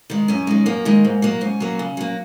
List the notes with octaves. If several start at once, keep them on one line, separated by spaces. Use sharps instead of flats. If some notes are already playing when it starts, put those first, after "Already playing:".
D#3 G#3
F#2 C#4
D#3 G#3
F#2 A#3
D#3 G#3
G#2
F#3 A#3
G#2 C#4
F#3 A#3
C#3
F#3 A#3